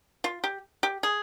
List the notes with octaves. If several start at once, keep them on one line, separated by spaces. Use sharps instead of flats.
F4
G4
G4
G#4